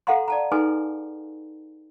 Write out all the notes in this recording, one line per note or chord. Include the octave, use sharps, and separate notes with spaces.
A4 F5 F#5 A#5 C6
D5 A5 A#5
D#4 G#4 A4 B4 G#5 C6